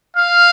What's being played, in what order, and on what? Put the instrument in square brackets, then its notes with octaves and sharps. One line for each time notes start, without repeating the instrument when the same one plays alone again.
[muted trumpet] F5